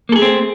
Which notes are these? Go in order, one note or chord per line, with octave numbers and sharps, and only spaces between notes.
A3 A#3 C4 G#4 A4